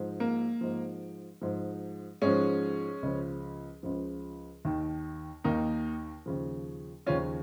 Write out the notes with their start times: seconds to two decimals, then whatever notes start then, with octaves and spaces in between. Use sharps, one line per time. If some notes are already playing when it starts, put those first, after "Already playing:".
Already playing: G#2 F3
0.20 A#3
0.61 G#2 F3
1.42 G#2 F3
2.22 G#2 F3 G#3 C#4
3.03 C#2 C#3 F3
3.83 C#2 C#3 F3
4.65 D#2 D#3
5.44 D#2 D#3 A#3 D#4
6.26 D#2 C#3 F3
7.06 D#2 C#3 F3 C#4 F4